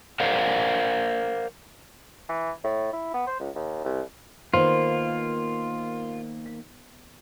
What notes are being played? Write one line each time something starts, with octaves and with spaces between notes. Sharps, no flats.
A#4 C5 D5 F5 F#5
E3
A2
E4
B3
C5
C#2
D#2
C2
D#3 A#3 B3 F4 C5
B6